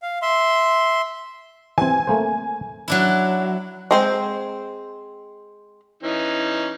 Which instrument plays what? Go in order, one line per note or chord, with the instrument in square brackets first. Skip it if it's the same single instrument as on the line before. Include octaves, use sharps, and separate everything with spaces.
[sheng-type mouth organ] F5
E5 C6
[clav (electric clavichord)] E3 C4 [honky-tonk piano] G#5
[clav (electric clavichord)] A3 A#3 C5
[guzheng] F#3 D4 E4
[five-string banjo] G#3 C4 C5
[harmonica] E3 C#4 D#4